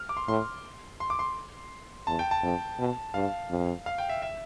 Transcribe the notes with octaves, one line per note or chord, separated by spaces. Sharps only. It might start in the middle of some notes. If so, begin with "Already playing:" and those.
Already playing: F6
D6
C6
A2 C6
C6
D6
C6
E2 A5
G5
A5
F2
B2
G2 F5
F2
F5
G5
E5
E5